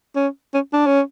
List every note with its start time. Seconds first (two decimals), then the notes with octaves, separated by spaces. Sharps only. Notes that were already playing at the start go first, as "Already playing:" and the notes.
0.16 C#4
0.54 C#4
0.73 D4
0.87 C#4